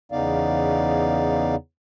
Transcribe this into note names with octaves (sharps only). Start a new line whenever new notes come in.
E2 C#3 B3 D#4 D5 F5